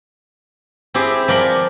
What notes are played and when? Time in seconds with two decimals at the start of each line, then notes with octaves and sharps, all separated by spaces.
0.94 C4 E4 G4 G#4
1.28 F3 A#4 D5 G5 B5